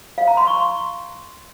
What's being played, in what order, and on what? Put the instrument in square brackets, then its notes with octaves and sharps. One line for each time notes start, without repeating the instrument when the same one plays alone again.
[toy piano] F5
A#5
C6
C#6
C6